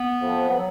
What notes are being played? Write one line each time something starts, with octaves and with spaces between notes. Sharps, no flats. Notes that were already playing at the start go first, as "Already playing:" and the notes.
Already playing: B3
F2 F3
B3
F#3